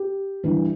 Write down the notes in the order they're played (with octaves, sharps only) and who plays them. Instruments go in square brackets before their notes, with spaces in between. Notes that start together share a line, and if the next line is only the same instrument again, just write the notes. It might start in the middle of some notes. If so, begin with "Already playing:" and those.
Already playing: [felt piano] G4
G2 E3 G3